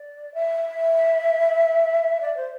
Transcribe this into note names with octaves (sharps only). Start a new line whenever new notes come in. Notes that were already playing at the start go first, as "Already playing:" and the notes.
Already playing: D5
E5
D5
C5